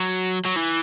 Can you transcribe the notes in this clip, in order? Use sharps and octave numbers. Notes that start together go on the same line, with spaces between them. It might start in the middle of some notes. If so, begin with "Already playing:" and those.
Already playing: F#3
F#3
E3